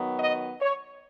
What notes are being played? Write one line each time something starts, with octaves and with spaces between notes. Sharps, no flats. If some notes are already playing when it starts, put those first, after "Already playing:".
Already playing: D#3 F#3 B3
D#5
C#5